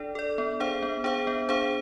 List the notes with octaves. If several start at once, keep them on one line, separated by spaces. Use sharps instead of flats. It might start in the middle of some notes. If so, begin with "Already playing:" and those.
Already playing: D4 A4 D5
A4 D5
B3
D4 G#4 C5 F5
B3
D4 G#4 C5 F5
B3
D4 G#4 C5 F5